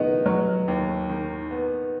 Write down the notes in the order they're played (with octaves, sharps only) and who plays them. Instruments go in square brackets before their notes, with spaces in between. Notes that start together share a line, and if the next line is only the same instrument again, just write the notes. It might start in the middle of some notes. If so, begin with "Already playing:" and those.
Already playing: [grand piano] D#3 B3 [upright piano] D#5
[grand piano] F#3
D#2
D#3
B3